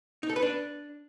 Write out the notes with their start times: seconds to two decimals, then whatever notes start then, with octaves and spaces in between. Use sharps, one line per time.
0.23 D#4
0.30 A4
0.36 B4
0.42 D4